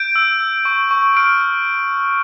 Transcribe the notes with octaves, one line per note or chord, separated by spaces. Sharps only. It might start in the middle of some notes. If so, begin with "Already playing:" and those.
Already playing: G6 D7
E6
E6
C#6
C#6
F6 D7